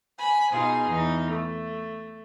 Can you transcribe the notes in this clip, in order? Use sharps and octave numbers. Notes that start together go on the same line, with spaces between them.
G#5 B5
B2 D#4 F4 G#4
E2 D#4
A3